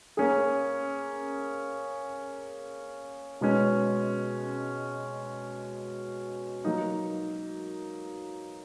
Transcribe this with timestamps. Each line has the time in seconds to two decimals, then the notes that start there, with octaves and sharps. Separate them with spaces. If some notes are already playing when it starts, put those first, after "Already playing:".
0.17 A#3 C#4 G#4
3.41 B2 G#3 C#4
6.64 F#3 A#3 D#4